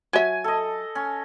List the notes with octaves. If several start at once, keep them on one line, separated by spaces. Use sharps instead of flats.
F#3 E5 G#5
A4 D#5
C#4